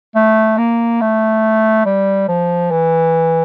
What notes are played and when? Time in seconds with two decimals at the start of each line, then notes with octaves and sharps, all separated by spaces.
0.15 A3
0.58 A#3
1.01 A3
1.85 G3
2.29 F3
2.71 E3